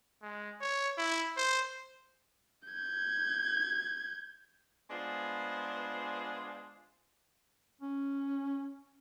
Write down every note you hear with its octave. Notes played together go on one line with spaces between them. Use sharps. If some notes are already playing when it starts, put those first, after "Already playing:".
G#3
C#5
E4
C5
G6 G#6
G#3 B3 D4 F4 G#4 C5
C#4